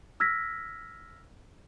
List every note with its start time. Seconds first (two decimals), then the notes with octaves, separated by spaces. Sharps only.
0.20 E6 F6 G#6 A#6 B6